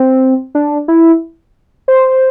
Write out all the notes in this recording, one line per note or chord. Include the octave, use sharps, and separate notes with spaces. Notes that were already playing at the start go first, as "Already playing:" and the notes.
Already playing: C4
D4
E4
C5